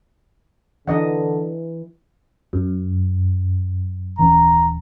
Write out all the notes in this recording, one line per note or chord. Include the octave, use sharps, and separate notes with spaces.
D3 E3 D4 D#5 F#5
F#2
D#1 E3 C#4 A#5